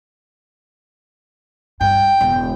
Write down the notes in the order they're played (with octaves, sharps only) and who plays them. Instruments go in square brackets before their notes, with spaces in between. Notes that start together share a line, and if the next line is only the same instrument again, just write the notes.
[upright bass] G2 [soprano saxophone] G5
[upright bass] E1